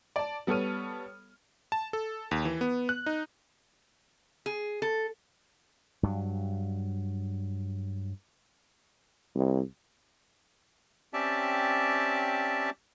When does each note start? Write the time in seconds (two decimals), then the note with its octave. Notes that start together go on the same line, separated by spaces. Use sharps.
0.16 D5 A5
0.47 G3 B3 A4 C#5 F6 D#7
1.72 A5
1.93 A4
2.31 D#2
2.45 E3
2.61 B3
2.89 F#6
3.06 D#4
4.46 G#4
4.82 A4
6.03 G2 F#3
9.35 C2
11.13 C4 C#4 G4 D5 E5 A5